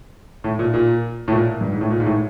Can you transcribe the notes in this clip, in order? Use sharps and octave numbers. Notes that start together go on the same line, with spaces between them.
A2
A#2
A#2
A2
A#2
G2
G#2
A2
A#2
G#2
A2